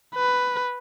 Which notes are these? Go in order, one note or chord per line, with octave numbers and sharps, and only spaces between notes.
B4